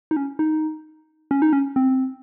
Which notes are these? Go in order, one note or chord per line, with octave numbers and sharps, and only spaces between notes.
D#4
C#4
D#4
C#4
D#4
C#4
C4